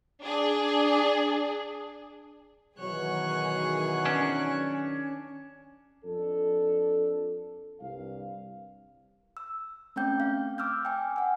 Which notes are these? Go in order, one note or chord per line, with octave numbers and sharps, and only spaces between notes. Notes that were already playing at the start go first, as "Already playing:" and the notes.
D4 G#4
B2 D#3 E3 F#3 G#4 C#5 F#6
C#4 D4
F2 D4 A4
C2 G2 F5
E6
A3 C4 C#4 G5 G6
F5
D6 E6 F6 G6
G5 G#5
F#5 G#5